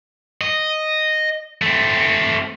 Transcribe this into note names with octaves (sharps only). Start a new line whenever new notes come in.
D#5
A3 C4